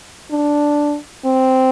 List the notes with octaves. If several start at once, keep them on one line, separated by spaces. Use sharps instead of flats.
D4
C4